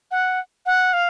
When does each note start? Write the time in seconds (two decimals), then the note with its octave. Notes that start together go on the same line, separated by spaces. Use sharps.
0.11 F#5
0.66 F#5
0.93 F5